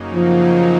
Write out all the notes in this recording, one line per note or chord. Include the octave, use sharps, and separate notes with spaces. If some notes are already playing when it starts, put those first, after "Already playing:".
Already playing: F#2 C#3 F#3 A#3 D#4
F3